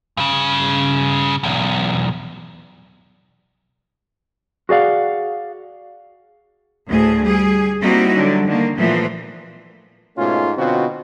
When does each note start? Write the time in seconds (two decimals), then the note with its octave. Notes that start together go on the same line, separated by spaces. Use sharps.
0.17 G2 C#3
1.43 B1 E2
4.69 F#4 G#4 D5 F5 F#5
6.87 D2 A2 G#4
7.24 G3 G#4
7.81 G3 A#3 C4 D#4 E4 F#4
8.14 D3 F#3 G3
8.48 D3 D#3 A#3
8.77 A#2 E3 F3 A3 B3
10.18 G#2 B2 A3 C#4 D#4 F4
10.57 B2 D3 C4 C#4 F4 F#4